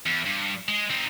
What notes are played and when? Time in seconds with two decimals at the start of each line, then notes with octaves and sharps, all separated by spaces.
0.06 E2
0.26 G2
0.68 G#3
0.91 C4 D#4